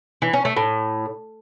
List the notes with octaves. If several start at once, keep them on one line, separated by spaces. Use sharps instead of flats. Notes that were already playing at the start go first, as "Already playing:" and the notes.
E3
C#4
A3
A2